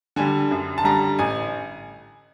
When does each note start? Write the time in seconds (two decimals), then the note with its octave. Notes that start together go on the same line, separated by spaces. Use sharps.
0.16 D3 G3 G#5
0.51 F#2
0.78 A5
0.84 D3 G3 A#5
1.19 A1 G#5